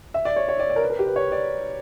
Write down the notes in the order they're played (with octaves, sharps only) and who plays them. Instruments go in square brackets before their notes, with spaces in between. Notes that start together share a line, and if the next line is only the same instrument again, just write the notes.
[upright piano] E5
D5
C#5
C#5
D5
D5
A#4
B4
A#4
G4
B4
C#5
D5